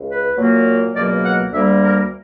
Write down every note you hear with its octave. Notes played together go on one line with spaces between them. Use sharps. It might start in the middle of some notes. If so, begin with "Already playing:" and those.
Already playing: C#2
B4
A#2 F#3 A#3
C#2 B2 F#3 A#3 D5
F#5
D2 D3 G3 A#3 E5
A#4